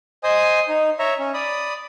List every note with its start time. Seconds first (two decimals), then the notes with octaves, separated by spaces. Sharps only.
0.23 C5 D#5 G#5 D#6
0.68 D#4
0.99 C#5 E5 A#5
1.19 C#4
1.34 D5 B5 D#6